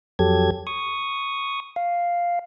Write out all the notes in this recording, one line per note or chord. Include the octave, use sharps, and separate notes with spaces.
F2 F#3 G4 A4 G#6
C#6 D#6
F5